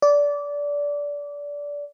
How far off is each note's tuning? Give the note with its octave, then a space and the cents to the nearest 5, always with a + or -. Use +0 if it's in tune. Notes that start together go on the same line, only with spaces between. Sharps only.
D5 -20